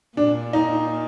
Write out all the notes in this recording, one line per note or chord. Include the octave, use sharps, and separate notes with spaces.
A#2 D4
D#4